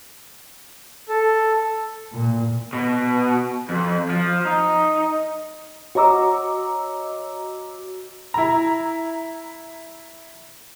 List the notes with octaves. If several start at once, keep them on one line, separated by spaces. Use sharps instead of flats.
A4
A#2
B2
F2
F3
D#4
F#4 C#5 D#5 A#5 D6 E6
E4 A#5